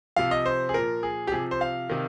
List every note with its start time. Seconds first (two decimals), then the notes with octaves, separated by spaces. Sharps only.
0.16 C3 F3 F5
0.31 D#5
0.46 C5
0.69 G#4
0.74 A#2 F3 A#4
1.03 G#4
1.27 G4
1.32 C3 F3 G#4
1.51 C5
1.61 F5
1.90 C3 D#3